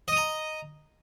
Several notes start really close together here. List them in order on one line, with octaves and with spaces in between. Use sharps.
D#5 D#6 A#5